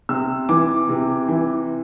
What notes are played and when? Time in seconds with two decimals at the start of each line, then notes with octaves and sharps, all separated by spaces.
0.09 C3 E6
0.49 E3 D6
0.89 C3
1.28 E3